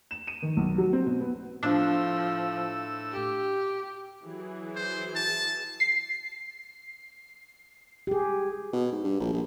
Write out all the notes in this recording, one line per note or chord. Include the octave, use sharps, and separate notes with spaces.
E7
D#7
D#3
B1
F#3
C4
B2
B3
A2 F3 D4 E6
G4
E3 F#3 G#4
C5
A5
C7
G4 G#4
B2
G#2
G2
A#1
A#1